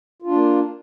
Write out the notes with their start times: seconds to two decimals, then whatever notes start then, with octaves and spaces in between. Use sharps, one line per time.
0.22 F4
0.27 D4
0.32 A#3